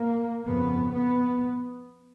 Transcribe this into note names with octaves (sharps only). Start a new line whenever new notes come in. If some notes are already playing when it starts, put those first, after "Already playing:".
Already playing: A#3
F2 C#3 B3
B3